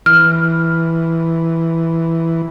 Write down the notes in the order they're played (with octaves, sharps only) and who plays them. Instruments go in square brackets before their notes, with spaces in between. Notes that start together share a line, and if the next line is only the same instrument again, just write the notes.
[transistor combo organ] E3 [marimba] F6